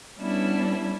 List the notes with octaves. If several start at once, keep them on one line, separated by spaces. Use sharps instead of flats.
G3 B3 C#4 D4 E4